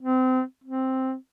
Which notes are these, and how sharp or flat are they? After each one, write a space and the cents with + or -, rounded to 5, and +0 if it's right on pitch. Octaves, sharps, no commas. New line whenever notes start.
C4 -25
C4 +0